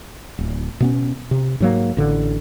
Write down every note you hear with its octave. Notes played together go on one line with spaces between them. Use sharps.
D1
B2 B3 C#4
C3
G#2 F#3 A#3
A1 D3